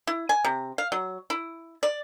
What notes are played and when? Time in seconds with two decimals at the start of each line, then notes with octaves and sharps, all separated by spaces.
0.07 E4
0.29 G#5
0.45 C3
0.78 F5
0.92 F#3
1.30 E4
1.83 D5